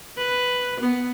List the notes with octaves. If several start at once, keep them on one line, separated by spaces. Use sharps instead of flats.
B4
B3